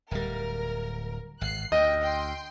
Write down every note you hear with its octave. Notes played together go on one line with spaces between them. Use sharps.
D1 G3 A#4
G#1 F#6 C7
D2 D#5 G5
G5 C6